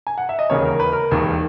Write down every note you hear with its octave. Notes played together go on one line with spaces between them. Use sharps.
G#5
F#5
E5
D#5
E1 D#2 C#3 C#5
A#4
B4
A#4
E1 D#2 D#3